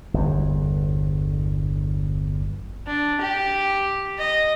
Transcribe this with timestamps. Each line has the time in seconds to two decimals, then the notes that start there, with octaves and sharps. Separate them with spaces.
0.14 G1 E2
2.87 D4
3.21 G4
4.18 D#5